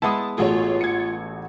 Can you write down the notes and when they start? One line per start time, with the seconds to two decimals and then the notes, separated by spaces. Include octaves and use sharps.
0.02 G#3 B3 E4 A5 D#6
0.38 A1 A3 F4 F#4 G#4 C#5
0.81 G#6 C#7